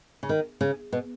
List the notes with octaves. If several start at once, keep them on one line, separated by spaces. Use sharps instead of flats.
C#3
D#3
C#3
B2